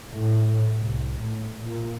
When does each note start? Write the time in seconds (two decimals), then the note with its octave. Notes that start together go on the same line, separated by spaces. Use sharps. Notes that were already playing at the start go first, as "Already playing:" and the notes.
0.11 A2
0.81 C2
1.20 A2
1.65 A#2